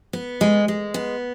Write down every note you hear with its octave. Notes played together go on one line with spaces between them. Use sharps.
B3
G#3
G#3
B3